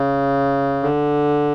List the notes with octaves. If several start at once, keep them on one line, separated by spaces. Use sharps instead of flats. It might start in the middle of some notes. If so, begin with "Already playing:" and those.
Already playing: C#3
D3